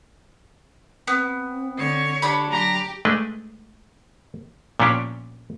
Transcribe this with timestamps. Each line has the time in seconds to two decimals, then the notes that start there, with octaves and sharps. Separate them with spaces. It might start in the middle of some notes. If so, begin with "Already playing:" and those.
1.07 B3 C4
1.78 D3 C#5
2.22 D4 G4 B5
2.51 F#3 G4 A#5
3.05 G#3 A3 D4 B4 D#5
4.80 A#2 F3 B3 C#4 D4 G4